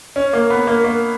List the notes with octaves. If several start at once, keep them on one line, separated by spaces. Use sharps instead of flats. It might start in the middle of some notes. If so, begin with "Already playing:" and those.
C#4
A#3
B3
A#3
A#3